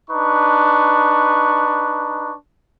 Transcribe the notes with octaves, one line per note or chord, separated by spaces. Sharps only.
D4 D#4 B4 C#6